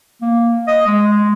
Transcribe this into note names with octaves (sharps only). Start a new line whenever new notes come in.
A#3
D#5
G#3